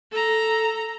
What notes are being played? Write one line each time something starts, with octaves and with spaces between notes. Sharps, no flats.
A4 A#5